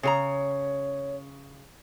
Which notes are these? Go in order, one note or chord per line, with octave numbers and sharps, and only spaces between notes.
C#3 G#4 C#5 A#5